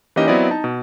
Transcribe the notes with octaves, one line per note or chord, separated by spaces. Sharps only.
E3 A#3 C#4 D#4 G4 D#5
F#3 B3 C4 E4 D5 D#5
D#4 A5
B2